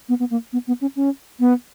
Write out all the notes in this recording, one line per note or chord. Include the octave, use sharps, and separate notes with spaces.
B3
B3
A#3
B3
B3
C#4
C#4
B3